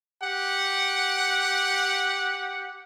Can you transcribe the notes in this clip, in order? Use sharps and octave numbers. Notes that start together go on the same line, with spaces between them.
G4 F#5